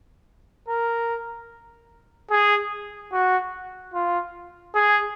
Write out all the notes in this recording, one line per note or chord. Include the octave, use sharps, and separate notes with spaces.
A#4
G#4
F#4
F4
G#4